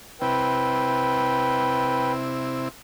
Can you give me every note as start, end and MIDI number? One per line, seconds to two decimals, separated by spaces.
0.21 2.68 48
0.21 2.68 60
0.21 2.68 64
0.21 2.12 71
0.21 2.12 79